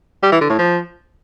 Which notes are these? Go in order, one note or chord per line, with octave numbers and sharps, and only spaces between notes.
G3
E3
D3
A2
F3